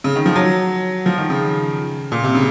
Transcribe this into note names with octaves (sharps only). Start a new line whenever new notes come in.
C#3
D#3
F3
F#3
F3
D#3
C#3
A#2
C3
C#3